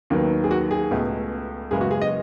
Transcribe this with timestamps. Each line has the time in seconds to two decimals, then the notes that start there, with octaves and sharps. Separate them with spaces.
0.10 D#2 D#3 F#3 B3
0.44 G#4
0.51 F#4
0.71 G#4
0.91 C#2 B2 A3
1.71 F#1 F#2 C#3 G#3 B3 G#4
1.81 F#4
1.91 G#4
2.01 D#5